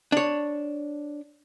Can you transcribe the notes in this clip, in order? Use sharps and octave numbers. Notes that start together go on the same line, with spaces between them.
D4 C#5